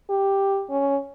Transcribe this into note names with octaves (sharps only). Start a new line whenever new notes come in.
G4
C#4